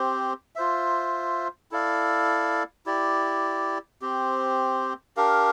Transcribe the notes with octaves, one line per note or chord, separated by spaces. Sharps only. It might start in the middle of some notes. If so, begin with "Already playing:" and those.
Already playing: C4 G4 C5
F4 C5 E5
E4 A4 D5 F5
E4 G4 D5
C4 G4 C5
D4 G4 A#4 F5